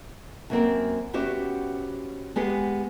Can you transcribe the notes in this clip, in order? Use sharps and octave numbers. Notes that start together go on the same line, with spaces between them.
F#2 A#3 C4 A#4
B3 C#4 F#4 G4 C5 E5
G#3 B3 G4 G#4 F#5